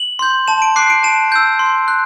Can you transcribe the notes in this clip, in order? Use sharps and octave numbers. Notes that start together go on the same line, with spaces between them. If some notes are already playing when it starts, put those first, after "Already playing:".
Already playing: F#7
C6 G6
A5 E7
D7
D6 F#6 C7
D7
A5 E7
E6 G6
C6
F#6